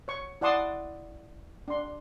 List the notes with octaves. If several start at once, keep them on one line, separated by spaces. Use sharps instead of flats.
C#5 C#6
E4 D5 F#5 A5 C6 D#6
D4 C6